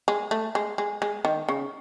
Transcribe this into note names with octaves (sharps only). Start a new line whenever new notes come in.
G#3
A3
G#3
G#3
G#3
D#3
C#3